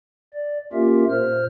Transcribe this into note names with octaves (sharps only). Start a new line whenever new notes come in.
D5
A#3 C#4 F4 G4 A#4 E5
A#2 C5 F6